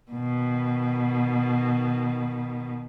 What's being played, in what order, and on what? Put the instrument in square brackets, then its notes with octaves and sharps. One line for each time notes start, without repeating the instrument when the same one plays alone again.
[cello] B2 D#3